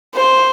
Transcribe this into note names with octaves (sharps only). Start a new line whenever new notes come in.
C5